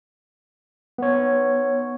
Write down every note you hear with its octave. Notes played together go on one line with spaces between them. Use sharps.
B3 C#5